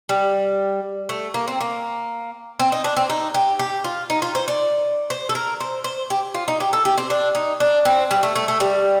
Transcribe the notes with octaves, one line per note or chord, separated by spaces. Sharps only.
G3
A3
A#3
C4
A#3
C4
D#4
D4
C4
D#4
G4
G4
F4
D#4
F4
C5
D5
C5
A4
A#4
C5
C5
G4
F4
D#4
G4
A4
G4
C4
D4
D#4
D4
C4
G3
A3
A3
A3
G3